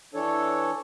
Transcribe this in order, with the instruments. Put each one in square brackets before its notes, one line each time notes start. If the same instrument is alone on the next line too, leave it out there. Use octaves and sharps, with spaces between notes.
[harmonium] E3 D4 A4 C#5